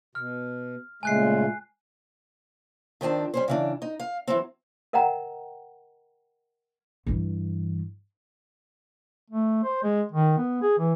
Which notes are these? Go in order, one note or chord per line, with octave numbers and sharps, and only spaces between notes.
B2 F6
A#2 C#3 G#3 A3 G#5 F#6 C7
D#3 F3 C4 D4
G3 C#4 C5
C#3 E3 D4
D#4
F5
E3 F#3 C4
A#4 D#5 F#5 G5 A#5
G2 E3
A3
C5
G#3
D#3
B3
G#4
E3